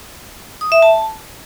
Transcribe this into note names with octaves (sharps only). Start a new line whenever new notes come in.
D#6
E5
A5